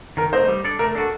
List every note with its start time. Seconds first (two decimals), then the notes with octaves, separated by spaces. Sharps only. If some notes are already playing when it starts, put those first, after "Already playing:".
0.17 D#3 A#4
0.33 A3 D#4 C5
0.48 G3
0.64 D4 A4 D5
0.79 A3 A#4
0.95 D4 F#4 A4